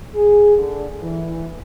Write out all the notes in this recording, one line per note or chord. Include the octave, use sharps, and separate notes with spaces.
G#4
D3
E3